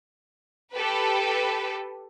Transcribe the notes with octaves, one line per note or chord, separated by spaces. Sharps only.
G4 A4 B4